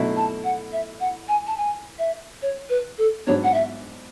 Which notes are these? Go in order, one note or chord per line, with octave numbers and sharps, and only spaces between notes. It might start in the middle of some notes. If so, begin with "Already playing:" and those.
Already playing: B2 F#3 A3 E4
A5
F#5
E5
F#5
G#5
A5
G#5
E5
C#5
B4
A4
G#2 F#3 B3 D4 C#5
F#5
E5